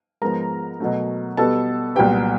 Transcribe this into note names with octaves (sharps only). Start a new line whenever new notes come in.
G#2 F3 G#3 B3 A#4 A#5
B2 F#3 A3
B2 G3 B3 A4 A5
C2 A#2 F#3 B3 G4 G5